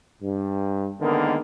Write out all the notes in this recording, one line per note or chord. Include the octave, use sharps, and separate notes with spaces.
G2
D3 D#3 G#3 A#3 B3